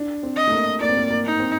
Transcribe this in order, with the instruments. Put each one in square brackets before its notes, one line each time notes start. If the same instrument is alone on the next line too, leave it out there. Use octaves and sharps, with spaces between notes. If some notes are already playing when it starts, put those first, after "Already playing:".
Already playing: [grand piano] D4
C4
[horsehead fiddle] D#5
[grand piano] A3
A#3
[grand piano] A#3 [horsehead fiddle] D5
[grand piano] C4
A#3
A#3
[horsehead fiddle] D#4
[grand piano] C4